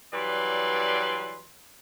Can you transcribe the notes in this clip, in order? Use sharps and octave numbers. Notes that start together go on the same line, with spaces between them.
E3 F#3 G3 B4 D5 C6